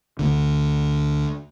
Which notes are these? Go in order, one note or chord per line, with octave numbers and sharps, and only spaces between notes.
D2 D3